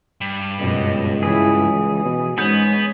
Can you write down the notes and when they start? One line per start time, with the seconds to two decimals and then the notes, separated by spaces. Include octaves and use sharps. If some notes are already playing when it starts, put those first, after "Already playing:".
0.21 G2
0.59 C#2 F#2 B2 D#5
1.23 C#3 E3 E4 G#4
1.67 E3
2.05 B2
2.38 G#2 G#3 B3 C#4 G#4 G6